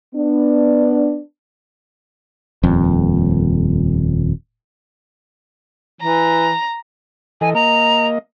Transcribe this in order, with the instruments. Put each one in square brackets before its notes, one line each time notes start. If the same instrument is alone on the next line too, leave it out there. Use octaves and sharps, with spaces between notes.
[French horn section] B3 D4
[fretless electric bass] D#1 F2
[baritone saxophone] E3 [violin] A#5
[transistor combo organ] E3 A4 D#5 [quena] G#5
[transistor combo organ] A#3 D#5 [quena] A#5